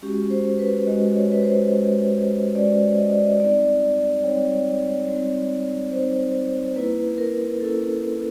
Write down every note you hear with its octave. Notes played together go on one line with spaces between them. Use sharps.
G#3 C#4 F#4 G4
C5
B4
G#3 C#4 F#4 D#5
C#5
B4
C5
G#3 C#4 F#4
G#3 C#4 F#4 D5
D#5
D5
D#5
G3 C4 D#4 D5
G3 C4 D#4 C#5
G3 C4 D#4
G3 C4 D#4 C5
A#3 C#4 E4 B4
A#4
A#3 C#4 E4 A4